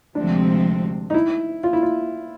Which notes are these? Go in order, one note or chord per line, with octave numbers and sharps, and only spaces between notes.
D2 C3 F3 G#3 C4 D4
D#4
E4
F4
E4
F4